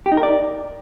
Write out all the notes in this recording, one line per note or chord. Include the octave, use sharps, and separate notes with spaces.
G4
D#4
A#4
D5